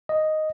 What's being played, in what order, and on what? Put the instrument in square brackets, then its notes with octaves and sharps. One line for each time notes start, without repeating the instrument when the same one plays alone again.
[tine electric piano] D#5